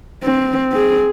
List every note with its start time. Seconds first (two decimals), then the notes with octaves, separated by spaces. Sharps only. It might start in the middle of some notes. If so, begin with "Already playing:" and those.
0.24 C4
0.72 C4 G#4